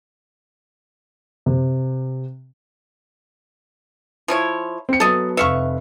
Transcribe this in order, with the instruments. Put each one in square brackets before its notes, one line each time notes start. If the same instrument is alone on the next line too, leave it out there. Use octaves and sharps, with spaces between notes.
[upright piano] C3
[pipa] F3 E4 C#5
[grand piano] C4 C#7
[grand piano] F#3 B3 [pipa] A4 D#5
[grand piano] F1 B4 [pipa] E5 F5 C#6